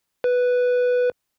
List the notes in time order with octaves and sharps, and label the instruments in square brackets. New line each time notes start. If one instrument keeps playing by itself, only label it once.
[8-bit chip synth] B4